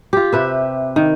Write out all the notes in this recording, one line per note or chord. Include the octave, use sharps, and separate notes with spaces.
F4 G4
C3 B4 E5
D#3